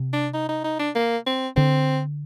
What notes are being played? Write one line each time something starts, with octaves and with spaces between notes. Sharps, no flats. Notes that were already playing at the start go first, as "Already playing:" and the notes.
Already playing: C3
D4
D#4
D#4
D#4
D4
A#3
C4
D3 C4